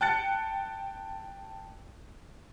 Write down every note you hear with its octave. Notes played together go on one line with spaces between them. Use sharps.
G5 A5 F#6 A6 C#7